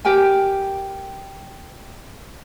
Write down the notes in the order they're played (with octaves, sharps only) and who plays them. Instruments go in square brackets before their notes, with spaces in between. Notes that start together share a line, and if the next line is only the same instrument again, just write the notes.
[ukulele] G4 A#4 G5 G#5